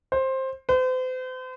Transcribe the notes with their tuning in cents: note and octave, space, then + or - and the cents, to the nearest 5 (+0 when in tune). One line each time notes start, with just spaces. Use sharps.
C5 +15
C5 -40